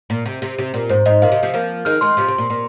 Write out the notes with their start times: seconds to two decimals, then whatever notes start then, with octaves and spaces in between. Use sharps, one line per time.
0.10 A#2
0.26 C3
0.42 C3
0.58 C3
0.74 A#2
0.89 G#2 C5
1.06 G#2 D#5
1.22 A#2 F5
1.32 C3
1.43 C3 F3
1.54 F3 A#3
1.85 D#3 G#3 F6
2.01 D#3 G#3 C6
2.17 C3 F3
2.28 C3
2.38 A#2
2.50 A#2